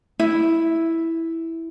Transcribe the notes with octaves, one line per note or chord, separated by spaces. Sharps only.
E4